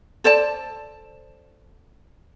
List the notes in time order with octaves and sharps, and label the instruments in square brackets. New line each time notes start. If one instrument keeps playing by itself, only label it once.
[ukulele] A4 C5 D5 A5